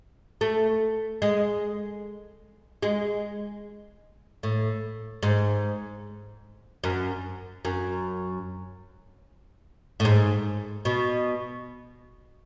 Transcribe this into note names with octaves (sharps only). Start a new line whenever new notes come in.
A3
G#3
G#3
A2
G#2
F#2
F#2
A2
G#2
B2